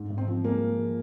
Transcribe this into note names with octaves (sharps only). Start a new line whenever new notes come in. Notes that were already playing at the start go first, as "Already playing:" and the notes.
Already playing: G#2
G#2
C4
F3
G#3 A#3
G#3
F3